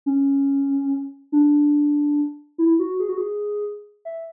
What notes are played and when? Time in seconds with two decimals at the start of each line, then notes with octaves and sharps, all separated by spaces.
0.06 C#4
1.32 D4
2.58 E4
2.79 F#4
3.00 G#4
3.09 F#4
3.18 G#4
4.05 E5